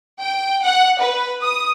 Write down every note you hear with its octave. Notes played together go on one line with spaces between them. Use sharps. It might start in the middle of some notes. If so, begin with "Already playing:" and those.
G5
F#5
B4
D#6